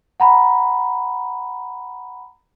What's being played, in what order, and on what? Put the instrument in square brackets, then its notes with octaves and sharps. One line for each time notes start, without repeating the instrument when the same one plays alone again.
[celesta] F#5 A#5 B5